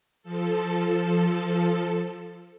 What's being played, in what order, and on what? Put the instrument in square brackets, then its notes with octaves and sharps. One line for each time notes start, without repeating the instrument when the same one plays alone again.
[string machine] F3 A4